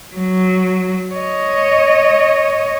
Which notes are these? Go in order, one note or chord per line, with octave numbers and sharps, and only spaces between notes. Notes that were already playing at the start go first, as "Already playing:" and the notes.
F#3
C#5 D#5